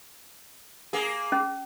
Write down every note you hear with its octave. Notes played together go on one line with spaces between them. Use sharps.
A#3 G#4
C#4